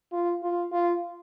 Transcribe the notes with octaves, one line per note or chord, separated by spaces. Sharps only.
F4
F4
F4